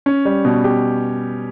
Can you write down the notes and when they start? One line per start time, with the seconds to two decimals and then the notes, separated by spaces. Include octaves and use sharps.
0.06 C#4
0.25 G3
0.45 B2
0.64 G4